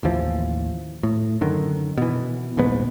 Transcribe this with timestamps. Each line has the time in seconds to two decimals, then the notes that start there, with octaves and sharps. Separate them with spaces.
0.03 A1 D#2 E3 F3
1.03 A2
1.41 F#2 D3 D#3
1.98 B2 E3
2.57 D#1 A#1 G#2 B3